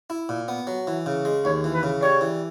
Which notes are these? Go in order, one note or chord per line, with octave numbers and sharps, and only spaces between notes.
E4
A#2
B3
F#3
E3
C#3
G#3
D#2 C#5
E3
B4
C#3
G3 C#5
E3